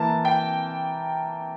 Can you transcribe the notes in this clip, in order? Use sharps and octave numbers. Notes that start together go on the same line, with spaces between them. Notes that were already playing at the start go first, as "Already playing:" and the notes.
Already playing: E3 A#3 A5
G5